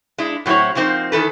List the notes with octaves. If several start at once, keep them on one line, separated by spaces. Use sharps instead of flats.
G#3 D4 E4
A2 F#3 C4 E4 C#5
F3 A#3 C4 D#4 C5
D#3 E3 A4 B4